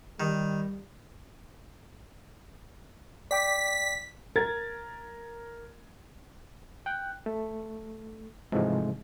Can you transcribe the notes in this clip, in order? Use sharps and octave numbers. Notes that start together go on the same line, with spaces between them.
D#3 G3
D5 G5 D6 B6
A#4 G#6 A6
G5 F#6
A3
G#2 C3 E3 F3 G#3 A3